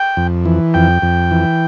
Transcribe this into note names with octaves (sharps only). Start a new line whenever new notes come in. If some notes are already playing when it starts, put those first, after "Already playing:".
Already playing: G5
F2
E3
F2 G5
F2
E3